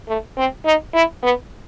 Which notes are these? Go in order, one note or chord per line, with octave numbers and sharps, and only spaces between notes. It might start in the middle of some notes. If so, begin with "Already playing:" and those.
A3
C4
D#4
E4
B3